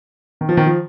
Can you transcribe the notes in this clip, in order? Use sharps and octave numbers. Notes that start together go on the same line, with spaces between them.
D#3
F3
D#3
F3